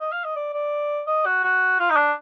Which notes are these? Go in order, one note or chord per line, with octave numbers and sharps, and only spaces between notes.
D#5
F5
D#5
D5
D5
D#5
F#4
F#4
F4
D#4
D4